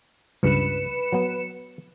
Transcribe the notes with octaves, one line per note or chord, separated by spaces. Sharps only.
C#2 G2 B4 C#7 E7
F#3 B3